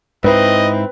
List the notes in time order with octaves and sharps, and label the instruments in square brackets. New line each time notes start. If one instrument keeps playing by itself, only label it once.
[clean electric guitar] G#2 D#4 E4 [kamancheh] C4 [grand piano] B4 [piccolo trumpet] D#5